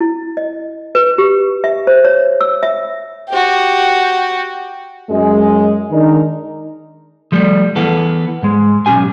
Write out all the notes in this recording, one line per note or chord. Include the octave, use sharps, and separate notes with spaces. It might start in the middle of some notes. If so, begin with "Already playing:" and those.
E4
D#5
B4
G4
E5
C5
C#5
E6
E5
F#4 G4
F#2 G#3
D#3 G#3 D4 D#4 A#4
F3 G3 A3
E3 B3 A4
G#2 G#3
B1 D#3 C#4 G4 G#5